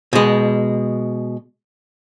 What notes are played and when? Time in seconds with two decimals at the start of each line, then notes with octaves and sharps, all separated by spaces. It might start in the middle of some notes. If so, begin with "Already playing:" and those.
0.13 B2 G#3